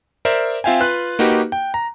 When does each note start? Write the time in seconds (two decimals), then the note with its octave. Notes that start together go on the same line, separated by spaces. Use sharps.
0.25 A#4 C5 D5 E5
0.64 C4 F4 E5 F5 G5 G#5
0.80 F4 B4 F#6
1.19 A#3 D#4 F#4 G4 B4
1.52 G5
1.74 A#5